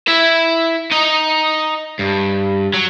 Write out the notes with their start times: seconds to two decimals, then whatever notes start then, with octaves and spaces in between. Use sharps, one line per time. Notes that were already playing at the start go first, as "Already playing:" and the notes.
0.08 E4 E5
0.91 D#4 D#5
1.99 G2
2.74 F#3